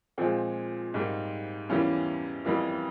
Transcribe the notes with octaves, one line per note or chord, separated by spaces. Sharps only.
A#2 F3 G#3 C4
G#2 G3 A#3
E2 E3 G3 A#3 C#4
F2 E3 G3 A#3